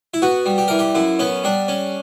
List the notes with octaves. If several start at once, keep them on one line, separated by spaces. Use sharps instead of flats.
E4
B3 F#4
G3
G4
E3 A#4
G4
F#2 E4
B3 C#4
G3 D4
C#4